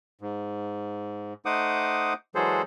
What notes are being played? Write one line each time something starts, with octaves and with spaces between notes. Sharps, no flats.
G#2
A3 D#4 C5 F#5 D6 D#6
E3 F#3 G#3 G#4 A4 C5